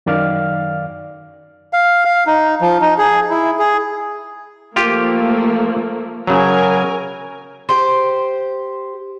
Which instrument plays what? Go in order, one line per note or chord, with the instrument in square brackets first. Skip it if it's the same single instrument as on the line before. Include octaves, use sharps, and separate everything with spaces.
[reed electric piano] F#2 D#3 D5 F5 F6
[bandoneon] F5
F5
D#4
F3
D#4
G#4
E4
G#4
[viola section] F3 A3 A#3 [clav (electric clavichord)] F4 G4
[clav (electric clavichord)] C#3 F#3 [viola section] A#4 G#5
[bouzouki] G4 C5